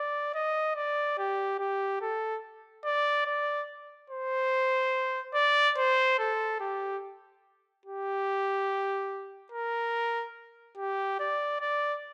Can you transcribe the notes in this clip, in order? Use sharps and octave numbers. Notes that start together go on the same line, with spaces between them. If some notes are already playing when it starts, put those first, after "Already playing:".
Already playing: D5
D#5
D5
G4
G4
A4
D5
D5
C5
D5
C5
A4
G4
G4
A#4
G4
D5
D5